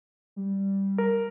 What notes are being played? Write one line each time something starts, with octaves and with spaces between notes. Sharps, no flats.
G3
A#4